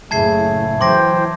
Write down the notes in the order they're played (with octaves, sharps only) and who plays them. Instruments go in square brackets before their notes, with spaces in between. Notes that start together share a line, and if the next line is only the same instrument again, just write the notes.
[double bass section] F#1 A2 [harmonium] C#3 A3 [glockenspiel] A5 G#6 C7
[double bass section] E3 F#3 [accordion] C5 G5 [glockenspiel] C6 D6 A#6